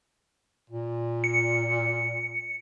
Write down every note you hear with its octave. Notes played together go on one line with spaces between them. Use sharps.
A#2
C#7